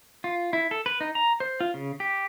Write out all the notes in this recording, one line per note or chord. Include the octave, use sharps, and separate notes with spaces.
F4
E4
A4
B4
D#4
A#5
C5
F4
C#3
G4